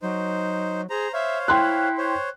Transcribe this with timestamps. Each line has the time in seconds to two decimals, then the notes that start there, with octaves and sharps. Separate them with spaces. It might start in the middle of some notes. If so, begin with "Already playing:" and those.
0.02 F#3 D#4 C5
0.90 G#4 C5 A#5
1.13 C5 C#5 E5 F5
1.48 E4 G5 C6 F#6
1.98 C5 C#5